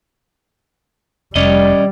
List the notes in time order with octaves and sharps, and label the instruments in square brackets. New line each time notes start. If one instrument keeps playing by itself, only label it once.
[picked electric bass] F1 [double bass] G3 [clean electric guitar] C#4 D#5 [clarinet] D5